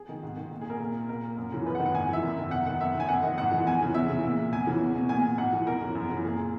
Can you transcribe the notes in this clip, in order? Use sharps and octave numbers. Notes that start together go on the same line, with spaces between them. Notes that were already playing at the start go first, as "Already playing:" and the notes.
Already playing: G#4
D#3
G#2
D#3
A#2
G#4
A#4
A#2
A#2 A#4
F#2
C#3 E3
F#2 B4
F#5
D#3
F#5
G#2 G#5
E3 E5
F#2
D#3
E2 F#5
D#3 F#5
F#2 E5
D#3
G#5
F#2 F#5
D#3 D#5
G#2 F#5
E3
E2 G#5
C#3 E3
E2 E5
C#3 E3
A#2
E2 G#5
C#3 E3
E2
B2
A#2 G#5
G#2 F#5
E3
E2 A#4
C#3 E3
F#2
C#3 E3
A#2 G#4